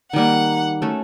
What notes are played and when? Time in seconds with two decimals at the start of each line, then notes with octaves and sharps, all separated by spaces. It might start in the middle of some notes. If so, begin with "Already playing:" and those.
0.13 D#3 G3 A#3 F#5
0.82 A3 C#4 F#4 A4